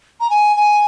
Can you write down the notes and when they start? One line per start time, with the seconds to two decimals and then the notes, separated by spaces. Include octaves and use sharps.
0.20 A#5
0.30 G#5
0.56 G#5